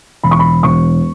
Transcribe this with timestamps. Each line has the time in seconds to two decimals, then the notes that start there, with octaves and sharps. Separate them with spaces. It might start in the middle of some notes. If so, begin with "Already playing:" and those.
0.23 E1 B5
0.31 C#6
0.39 B5
0.63 E1 C#6